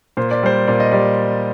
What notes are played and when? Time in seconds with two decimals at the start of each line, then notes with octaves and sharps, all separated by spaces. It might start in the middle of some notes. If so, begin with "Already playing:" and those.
0.17 A#2 C5
0.31 D5
0.43 G3 C5
0.67 A#2 D5
0.80 D#5
0.91 G3 D5